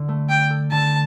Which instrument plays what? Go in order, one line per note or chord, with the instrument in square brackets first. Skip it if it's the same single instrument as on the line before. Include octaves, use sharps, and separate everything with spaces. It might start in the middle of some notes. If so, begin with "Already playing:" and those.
Already playing: [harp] D3
A3
[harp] D4 [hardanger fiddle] G5
[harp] A4
[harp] D3 [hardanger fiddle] A5